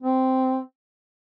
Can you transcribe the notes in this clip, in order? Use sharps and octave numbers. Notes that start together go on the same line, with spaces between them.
C4